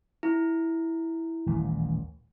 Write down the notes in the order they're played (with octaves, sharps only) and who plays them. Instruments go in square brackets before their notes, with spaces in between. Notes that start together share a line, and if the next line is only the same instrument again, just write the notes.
[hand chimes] E4
[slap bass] D#1 A1